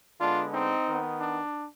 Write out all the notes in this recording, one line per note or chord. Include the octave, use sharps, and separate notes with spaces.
D3 G#3 B3 D4 F4
C4 D#4
D#3 B3
D4